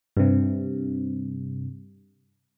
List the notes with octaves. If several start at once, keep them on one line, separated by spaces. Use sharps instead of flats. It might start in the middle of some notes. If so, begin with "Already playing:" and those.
G2 C3